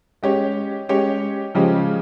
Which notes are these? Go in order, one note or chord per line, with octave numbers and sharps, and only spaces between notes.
G#3 C#4 G4 C#5
G#3 C#4 G4 C#5
C#3 F3 G#3 C#4 G4